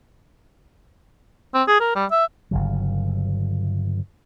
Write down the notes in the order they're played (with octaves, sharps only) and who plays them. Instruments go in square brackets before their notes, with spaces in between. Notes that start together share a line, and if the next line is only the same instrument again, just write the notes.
[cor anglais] C4
G#4
A#4
G3
E5
[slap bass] G1 C#3 F#3